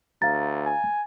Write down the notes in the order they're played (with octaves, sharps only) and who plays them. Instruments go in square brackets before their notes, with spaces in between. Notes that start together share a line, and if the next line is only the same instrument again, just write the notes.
[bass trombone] D2 [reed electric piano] F5 A#5 [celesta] A6
[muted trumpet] G#5